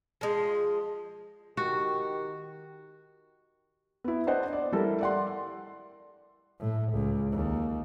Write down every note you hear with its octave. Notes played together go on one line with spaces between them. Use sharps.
F3 G#3
D#3 F#4 G4
B3 E4
D4 C5 D#5 F#5
D5
G3 E4 A4 A#4
D5 F#5 C6
A2
C#2
D#2